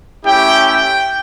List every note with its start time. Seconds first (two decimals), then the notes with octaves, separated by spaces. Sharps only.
0.24 A3 C#4 E4 G4 G5
0.65 G5